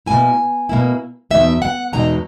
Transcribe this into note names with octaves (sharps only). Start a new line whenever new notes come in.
B2 A#3 E4 G#5
B2 A#3 E4
E2 B2 G#3 D#4 E5
F#5
E2 B2 G#3 D#4 A#5